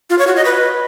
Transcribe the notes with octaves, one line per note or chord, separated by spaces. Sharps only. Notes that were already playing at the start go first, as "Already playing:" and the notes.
F4
C#5
F#4
D#5
B4